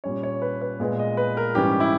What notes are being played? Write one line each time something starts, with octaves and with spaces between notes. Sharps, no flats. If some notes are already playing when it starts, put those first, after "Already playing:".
A#2 G3 C#4 C#5
C#5
B4
B4
A#2 G#3 B3
D#5
B4
A#4
G#2 E3 G3 C#4 G4
E4